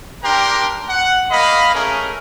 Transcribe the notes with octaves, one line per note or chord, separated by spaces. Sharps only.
D4 G4 A#4 G5 A#5 C6
F#5
A#3 D#5 F5 B5
A3 C#4 G#4 A#4